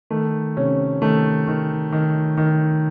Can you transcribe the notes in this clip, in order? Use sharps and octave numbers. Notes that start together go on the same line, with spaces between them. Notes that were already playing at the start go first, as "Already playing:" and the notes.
D#3 A3
C3 C#4
D#3 A3
D#3
D#3
D#3